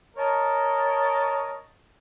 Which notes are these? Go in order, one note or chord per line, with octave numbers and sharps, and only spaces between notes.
A#4 C#5 D#5 A5